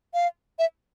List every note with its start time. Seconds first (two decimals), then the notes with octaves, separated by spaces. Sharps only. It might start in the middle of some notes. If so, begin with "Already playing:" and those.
0.14 F5
0.59 E5